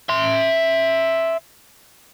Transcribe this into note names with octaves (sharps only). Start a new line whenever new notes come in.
E5 C6